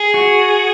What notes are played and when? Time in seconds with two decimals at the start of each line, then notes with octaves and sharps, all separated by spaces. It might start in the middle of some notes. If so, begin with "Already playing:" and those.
Already playing: G#4
0.14 F#4